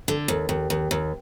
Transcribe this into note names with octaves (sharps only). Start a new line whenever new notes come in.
D3
D#2
D#2
D#2
D#2